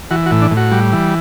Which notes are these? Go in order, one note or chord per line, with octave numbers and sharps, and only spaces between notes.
E3 F#4
F#4
A2
D4
A2
F#4
G3
E3